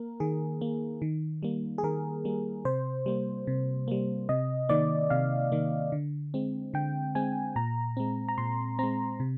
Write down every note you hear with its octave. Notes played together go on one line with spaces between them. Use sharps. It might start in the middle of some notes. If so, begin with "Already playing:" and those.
Already playing: A#3 A#4
D#3 G#4
A#3
D#3
G3 A#3
G#4
D#3 A#4
G3 A#3
C3 C5
G3 A#3
C3
G3 A#3
C3 D#5
D#3 A#3 D5
C3 F5
D#3 A#3
D3
G#3 C4
D3 G5
G#3 C4 G#5
A#2 A#5
G#3 C4
A#5
A#2 C6
G#3 C4 A#5
C3